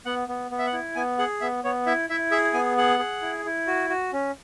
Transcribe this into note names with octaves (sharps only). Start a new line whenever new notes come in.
B3 F#5
B3
B3
E5
F#5
E4
B3 G#5
G#4 F#5
B3 E5
B3 C#5
E4 E5
E4 E5
G#4 E5
B3 G#5
G#4 F#5
G#4
E4
E4
F#4
F#4
C#4